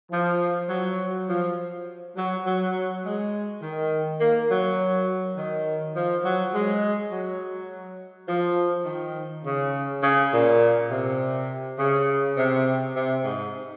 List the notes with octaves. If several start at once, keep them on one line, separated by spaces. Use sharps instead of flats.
F3
F#3
F3
F#3
F#3
G#3
D#3
A#3
F#3
D#3
F3
F#3
G#3
F#3
F3
D#3
C#3
C#3
A#2
C3
C#3
C3
C3
G#2